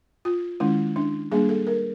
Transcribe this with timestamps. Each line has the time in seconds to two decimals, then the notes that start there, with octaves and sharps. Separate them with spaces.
0.25 F4
0.60 D#3 G#3 C#4 E4
0.96 D4
1.32 G3 A#3 D4 G#4
1.49 A4
1.67 A#4